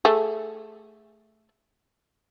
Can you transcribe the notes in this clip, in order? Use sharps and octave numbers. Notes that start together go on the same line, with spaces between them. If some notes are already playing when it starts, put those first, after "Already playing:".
A3 G#4